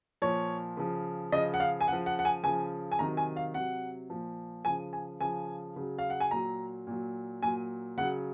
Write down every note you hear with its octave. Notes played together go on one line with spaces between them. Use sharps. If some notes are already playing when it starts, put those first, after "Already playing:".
A#2 F3 C#5
C#3 F3
C#3 F3 D#5
F#5
F5
G#5
C#3 F3 F#5
F#5
F#5
G#5
C#3 F3 G#5
G#5
C3 D#3 F#3 A#5
G#5
F5
C3 F#3 F#5
A#2 F3
C#3 F3 G#5
G#5
C#3 F3 G#5
C#3 F#3
F5
F#5
G#5
A#2 F#3 A#5
A#2 F#3
A#2 F#3 G#5
C#3 F#3 F#5